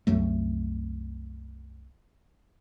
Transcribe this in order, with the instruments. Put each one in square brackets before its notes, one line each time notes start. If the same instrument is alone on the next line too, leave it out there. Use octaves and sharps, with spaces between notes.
[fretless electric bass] C2 F#2 F#3 A3